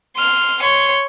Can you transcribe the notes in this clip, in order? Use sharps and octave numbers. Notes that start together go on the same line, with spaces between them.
C6 F6
C#5 C6